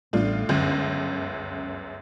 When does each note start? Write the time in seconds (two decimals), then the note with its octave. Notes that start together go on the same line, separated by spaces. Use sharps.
0.13 A1 A2 G3 B3 D4 F4
0.49 G1 C#2 F#2 D3 C#4